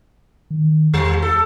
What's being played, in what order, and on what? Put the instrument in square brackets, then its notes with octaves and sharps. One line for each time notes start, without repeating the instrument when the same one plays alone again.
[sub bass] D#3
[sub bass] E2 [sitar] G3
[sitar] A4